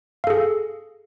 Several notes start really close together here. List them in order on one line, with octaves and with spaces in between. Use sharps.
F5 A4 G#4